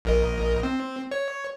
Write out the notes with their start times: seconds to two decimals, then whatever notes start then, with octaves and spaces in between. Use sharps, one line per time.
0.05 A#1 A#4 D#5
0.63 C4
1.11 C#5